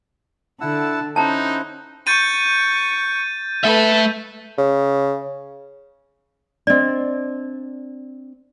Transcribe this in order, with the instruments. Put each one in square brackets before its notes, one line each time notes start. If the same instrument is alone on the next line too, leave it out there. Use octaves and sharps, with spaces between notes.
[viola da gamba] D3 [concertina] E4 F#5 E6 [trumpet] A5
[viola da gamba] C#4 [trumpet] D#4 [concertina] E4 C5 F#5 [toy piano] A5 A#5
[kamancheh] C#6 [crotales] G6 A6 D#7
[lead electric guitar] A3 E5 [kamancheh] A4 B4
[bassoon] C#3
[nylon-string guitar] C4 D4 [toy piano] D5 D#5